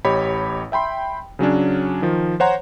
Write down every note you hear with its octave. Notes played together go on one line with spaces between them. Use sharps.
A1 G4 C#5 D#5 B5
E5 G5 B5 C6
C#3 F#3 C#4 D4
D#3 F3
C5 C#5 F#5 A#5 C6